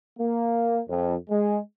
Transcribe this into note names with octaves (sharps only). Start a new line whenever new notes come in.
A#3
F2
G#3